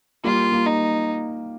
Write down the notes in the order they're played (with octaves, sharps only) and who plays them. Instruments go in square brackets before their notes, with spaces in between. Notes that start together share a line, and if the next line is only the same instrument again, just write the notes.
[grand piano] G3 A#3 [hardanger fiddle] F4
[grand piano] G3 A#3
[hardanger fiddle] D#4